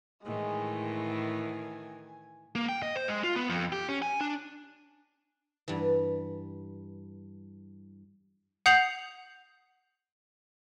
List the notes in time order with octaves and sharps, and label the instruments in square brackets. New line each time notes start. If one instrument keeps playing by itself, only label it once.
[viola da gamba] A2 D#3 E3 [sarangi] G#3
[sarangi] G#5
[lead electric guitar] A#3
G5
D#5
C5
G#3
F4
B3
F2
G4
C#4
G#5
D4
[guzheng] G2 E3
[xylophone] F#5 D#6 G6 C7 F7 F#7